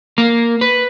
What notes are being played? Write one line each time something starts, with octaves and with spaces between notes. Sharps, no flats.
A#3 A#4
B4